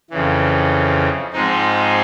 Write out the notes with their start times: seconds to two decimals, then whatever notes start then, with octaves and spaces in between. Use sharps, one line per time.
0.11 F2 C#3 E3
1.33 G#2 F3 G#3 C4 D#4